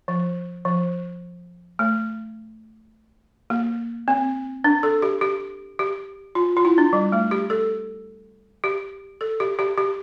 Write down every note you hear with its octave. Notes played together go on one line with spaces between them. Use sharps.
F3
F3
A3
A#3
C4
D4
A4
G4
G4
G4
F4
F4
E4
D4
G3
A3
G4
A4
G4
A4
G4
G4
G4